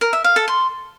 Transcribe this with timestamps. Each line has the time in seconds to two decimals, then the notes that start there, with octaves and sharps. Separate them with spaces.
0.01 A#4
0.13 E5
0.24 F5
0.36 A4
0.48 C6